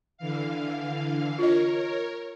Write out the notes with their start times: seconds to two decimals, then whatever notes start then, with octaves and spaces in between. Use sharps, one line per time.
0.18 D3 E3 F5
1.39 F4 A#4 C#5 D#5